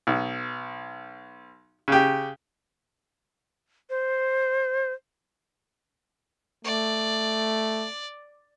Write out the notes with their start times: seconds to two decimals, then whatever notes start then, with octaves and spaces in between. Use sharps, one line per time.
0.07 B1
1.88 C#3 G4
3.90 C5
6.65 A3 D5